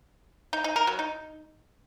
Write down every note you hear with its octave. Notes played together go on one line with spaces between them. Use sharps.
D#4
D#4
A#4
F#3
D#4